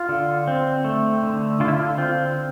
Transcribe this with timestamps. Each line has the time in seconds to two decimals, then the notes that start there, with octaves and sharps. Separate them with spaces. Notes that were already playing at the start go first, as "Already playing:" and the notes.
Already playing: F4
0.09 D3
0.48 C4
0.85 A3
1.23 D3
1.60 D3 F4
1.68 E4
1.74 F4
1.98 C4 F4